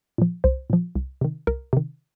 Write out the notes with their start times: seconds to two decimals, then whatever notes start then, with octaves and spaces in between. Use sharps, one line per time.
0.18 A#2 F3
0.44 C2 C5
0.70 A#2 F3
0.95 C2
1.21 C3 D#3
1.47 C2 A#4
1.73 C3 D#3